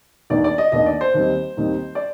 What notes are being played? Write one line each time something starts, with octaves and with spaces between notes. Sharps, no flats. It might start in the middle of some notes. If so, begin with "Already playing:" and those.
D#2 D#3 B3 D4 D5
D5
D#5
D#2 D#3 B3 D4 D#5
D5
C5
D#2 D#3 G3 C4 D#4
D#2 D#3 G3 C4 D#4
D5